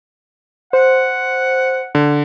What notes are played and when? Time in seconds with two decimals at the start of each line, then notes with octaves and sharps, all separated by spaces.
0.73 C5 F#5
1.95 D3